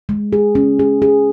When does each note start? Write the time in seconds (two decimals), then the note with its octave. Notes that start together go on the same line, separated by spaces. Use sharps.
0.09 G#3
0.33 G#4
0.55 C#4
0.79 G#4
1.02 G#4